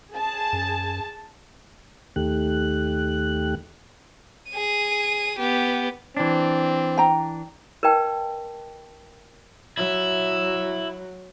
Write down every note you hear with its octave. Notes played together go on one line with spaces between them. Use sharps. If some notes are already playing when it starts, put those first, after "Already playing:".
G#4 A5
F#2
D#2 D#3 A3 G4 F#6
G#4 D#7
B3 G4
E3 C4 D4
G5 A#5
A#4 B4 D#5 G5 A5
F#3 E4